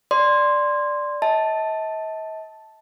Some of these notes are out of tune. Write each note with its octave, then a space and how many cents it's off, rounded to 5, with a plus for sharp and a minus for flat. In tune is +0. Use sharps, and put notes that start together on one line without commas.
D5 +0 C6 +0
D#5 +45 A5 +0